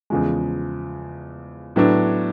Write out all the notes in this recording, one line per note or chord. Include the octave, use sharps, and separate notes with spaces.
E2 C#3 F3 G#3
A2 F#3 B3 D4